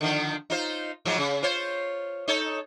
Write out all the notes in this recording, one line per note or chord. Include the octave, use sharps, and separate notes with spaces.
D3 D#3 F3
D#4 F4 C5
G#2 F3 F#3
C#3
F4 C5 C#5
D#4 A4 C#5